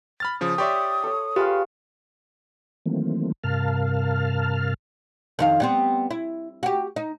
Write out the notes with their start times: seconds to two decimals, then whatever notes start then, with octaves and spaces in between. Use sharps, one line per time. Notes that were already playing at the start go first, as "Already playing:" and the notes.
0.20 B5 F6 A6
0.41 C#3 F3 D#6
0.58 G4 C#5 D5 E5 C6 C#6
1.04 A4 C#5
1.36 F4 G4 G#4 B4 F5
2.86 D#3 E3 F#3 A3 A#3 C4
3.44 G2 C3 A#4 F5 A5 F6
5.39 F2 D#3 F5
5.60 G3 B3 C4
6.11 E4
6.63 F#4 G4
6.96 D#4